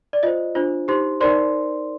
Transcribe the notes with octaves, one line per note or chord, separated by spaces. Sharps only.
D5
F4 C5 D#5
D4 F4 C5
D#4 G4 C5 C6
D#4 A#4 C5 D5 C6